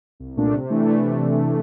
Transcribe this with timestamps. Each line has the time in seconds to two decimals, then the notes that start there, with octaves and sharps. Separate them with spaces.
0.20 C2
0.37 A#2 A3 D4
0.54 C3
0.70 E3 A3 D4